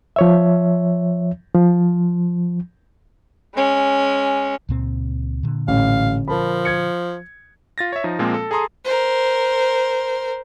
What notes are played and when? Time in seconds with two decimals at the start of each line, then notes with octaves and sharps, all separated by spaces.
0.16 F3 C#5 E5
1.55 F3
3.55 G#3 C#4
4.69 C#2 A#2 C4
5.43 A#2 D3
5.68 A1 F5
6.28 F3 A#4 A5 B5
6.65 G#6 C#7
7.78 F4 A6 A#6
7.93 C#5 E5
8.04 F3 D#4
8.19 A#2 F3 G#3 A#3 C4
8.34 A4
8.51 G#4 A4 A#5 C6 D#6
8.84 A#4 C5